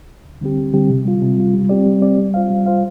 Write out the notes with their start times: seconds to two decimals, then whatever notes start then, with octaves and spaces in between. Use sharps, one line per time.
0.25 D2
0.41 D3 G3 C4 G4
0.57 D2
0.73 D3 G3 C4 G4
0.90 C3
1.05 G3 F4
1.22 C3
1.38 G3 F4
1.54 G3
1.69 C4 G4 D5
1.86 G3
2.02 C4 G4 D5
2.18 G3
2.34 F4 C5 F5
2.50 G3
2.66 F4 C5 F5